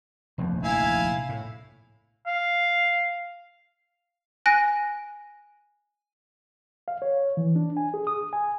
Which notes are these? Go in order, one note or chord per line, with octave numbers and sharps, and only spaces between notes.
F1 A#1 D#2
E4 F5 G#5
A2
F5
G#5 F#6 A#6 D7
F5
C#5
E3
D4
G#5
G#4
D#6
G#5